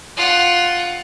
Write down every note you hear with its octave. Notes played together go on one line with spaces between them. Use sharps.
F4 F#5